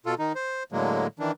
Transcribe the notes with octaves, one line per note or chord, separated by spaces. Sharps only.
B2 F4 A4
D#3 D#4
C5
A2 D3 F#3 G#3 A#3
D#3 E3 D4